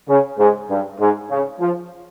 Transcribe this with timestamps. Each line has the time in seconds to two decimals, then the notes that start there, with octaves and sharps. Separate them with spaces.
0.08 C#3
0.38 G#2
0.69 G2
0.99 G#2
1.30 C#3
1.60 F3